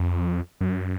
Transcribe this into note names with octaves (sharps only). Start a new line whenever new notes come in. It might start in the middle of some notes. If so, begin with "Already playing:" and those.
Already playing: F2
F#2